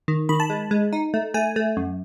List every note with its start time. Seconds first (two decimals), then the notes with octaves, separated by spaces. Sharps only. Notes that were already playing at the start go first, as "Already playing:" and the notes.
0.08 D#3
0.29 D#3 B5
0.40 A5
0.50 G#3
0.71 G#3
0.93 D#4
1.14 A3
1.34 A3 G#5
1.56 A3
1.77 F#2